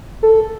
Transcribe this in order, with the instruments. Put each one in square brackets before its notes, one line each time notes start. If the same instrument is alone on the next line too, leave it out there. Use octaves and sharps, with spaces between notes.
[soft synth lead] A4